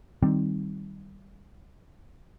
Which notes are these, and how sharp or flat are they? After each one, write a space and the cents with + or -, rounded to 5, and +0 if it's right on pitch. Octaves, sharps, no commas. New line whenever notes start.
D#3 +0 G3 +0 C4 +0